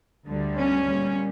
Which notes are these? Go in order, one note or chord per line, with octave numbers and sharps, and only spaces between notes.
D2 D3 G3
C#4
A#2 G3